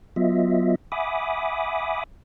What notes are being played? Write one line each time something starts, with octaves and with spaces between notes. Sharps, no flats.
F#3 B3 F4 D#5 E5
E5 F#5 G#5 B5 D6 D#6